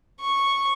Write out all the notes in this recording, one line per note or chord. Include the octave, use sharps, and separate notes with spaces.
C#6